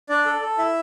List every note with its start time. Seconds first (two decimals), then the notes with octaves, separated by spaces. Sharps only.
0.09 D4 D5
0.25 A4
0.42 A4
0.58 E4 E5